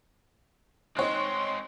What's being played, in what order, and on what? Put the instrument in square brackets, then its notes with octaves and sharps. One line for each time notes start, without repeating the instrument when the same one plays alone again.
[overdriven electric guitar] G#3 C4 [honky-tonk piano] D#4 C#5 F#6 [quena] C6